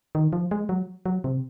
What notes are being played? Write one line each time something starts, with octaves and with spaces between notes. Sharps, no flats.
D#3
F3
G#3
F#3
F#3
C3